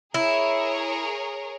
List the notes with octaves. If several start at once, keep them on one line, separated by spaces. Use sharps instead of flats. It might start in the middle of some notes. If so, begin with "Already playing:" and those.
E4 G#4 A#4 C#5